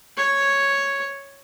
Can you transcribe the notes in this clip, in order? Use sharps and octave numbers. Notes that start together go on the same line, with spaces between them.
C#5